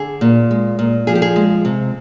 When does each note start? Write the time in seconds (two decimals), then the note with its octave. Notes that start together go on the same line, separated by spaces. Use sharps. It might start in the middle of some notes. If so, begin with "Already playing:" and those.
Already playing: D3 G#4
0.21 A#2
0.51 G#3
0.79 A#2
1.07 F3 G#4
1.15 G4
1.22 G#4
1.36 G#3
1.65 C3